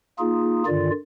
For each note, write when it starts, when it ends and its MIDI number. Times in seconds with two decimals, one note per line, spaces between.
0.19 0.63 58
0.19 0.63 63
0.19 0.63 65
0.19 0.63 68
0.66 0.90 43
0.66 0.90 50
0.66 0.90 51
0.66 0.90 65
0.66 0.90 74